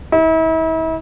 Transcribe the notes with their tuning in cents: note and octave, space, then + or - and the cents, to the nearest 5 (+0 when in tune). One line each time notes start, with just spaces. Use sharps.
E4 -40